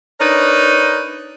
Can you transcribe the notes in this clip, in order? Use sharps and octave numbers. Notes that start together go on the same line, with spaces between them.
D4 D#4 A#4 B4 C#5 D5